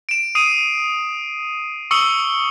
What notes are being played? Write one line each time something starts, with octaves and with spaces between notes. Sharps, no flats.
D7 E7
D#6 C7 D7 D#7
C#6 D#6 E6 C#7 F#7 G7